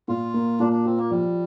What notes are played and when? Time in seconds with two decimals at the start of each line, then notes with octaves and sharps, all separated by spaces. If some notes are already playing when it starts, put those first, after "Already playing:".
0.08 A#2 F4
0.34 A#3
0.60 A#2 D4
0.73 D4
0.85 C4 F4
0.97 A#3
1.11 F3 G3